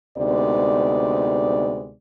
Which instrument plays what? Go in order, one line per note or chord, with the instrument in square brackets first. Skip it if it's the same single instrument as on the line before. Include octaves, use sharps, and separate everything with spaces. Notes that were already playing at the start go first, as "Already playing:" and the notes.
[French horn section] D2 C3 G#3 B3 D#4 D5